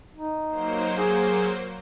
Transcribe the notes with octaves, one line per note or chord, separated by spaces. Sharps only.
D#4
F#3 A#3 C5
G#4